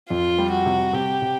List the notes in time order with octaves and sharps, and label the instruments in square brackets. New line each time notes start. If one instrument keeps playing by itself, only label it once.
[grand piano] F2 [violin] F4
[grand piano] G3
[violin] F#4
[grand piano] C3
[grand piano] C3 [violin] G4
[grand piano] C3